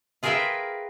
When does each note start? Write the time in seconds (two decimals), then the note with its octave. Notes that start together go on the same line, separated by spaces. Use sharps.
0.23 F4 G#4 A#4 B4 E5 G5